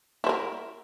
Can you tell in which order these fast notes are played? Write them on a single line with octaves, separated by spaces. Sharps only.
E4 C5 A#4